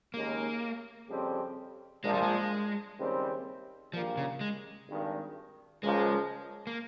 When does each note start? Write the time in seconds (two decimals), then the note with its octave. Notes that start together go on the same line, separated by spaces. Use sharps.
0.14 D#2 C#3 G#3 A#3 D#4
1.09 F2 C#3 G3 C4 G4
2.04 A#1 A#2 F3 G#3
2.14 G3
2.22 G#3
2.98 D#2 C#3 G3 C4
3.93 A#1 A#2 F3 G3 A#3
4.17 C#3
4.41 G#3
4.88 G#1 G2 D#3
5.83 C#2 C#3 F3 G#3 A#3 F4
6.67 A#3